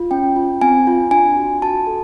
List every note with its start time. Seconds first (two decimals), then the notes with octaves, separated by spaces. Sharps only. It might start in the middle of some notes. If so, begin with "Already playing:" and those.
Already playing: F4
0.11 C#4 G5
0.36 F4
0.61 C4 G#5
0.87 F4
1.11 D4 G#5
1.37 F#4
1.62 F#4 A5
1.87 A4